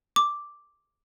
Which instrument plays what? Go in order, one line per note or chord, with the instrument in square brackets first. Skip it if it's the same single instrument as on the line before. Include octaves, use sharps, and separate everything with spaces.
[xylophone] D6